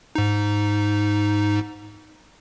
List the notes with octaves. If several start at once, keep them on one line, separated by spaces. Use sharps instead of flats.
G#2 D#4